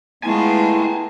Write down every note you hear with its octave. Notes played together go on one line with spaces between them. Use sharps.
G#3 A3 B3 E4 F4 G#5 A5